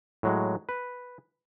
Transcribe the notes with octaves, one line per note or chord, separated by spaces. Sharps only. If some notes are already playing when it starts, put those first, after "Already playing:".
A2 F#3 G#3
B4